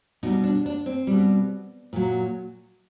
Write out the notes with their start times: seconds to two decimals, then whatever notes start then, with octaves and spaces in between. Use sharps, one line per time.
0.23 B2 D#4
0.25 G3
0.44 D4
0.66 D4
0.86 C4
1.07 B2 G3
1.93 A#2 F#3